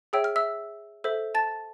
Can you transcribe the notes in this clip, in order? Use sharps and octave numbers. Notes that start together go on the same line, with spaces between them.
G#4 C#5 E5 G5 E6
F6
E5 E6
A4 C5 E5
A5 A6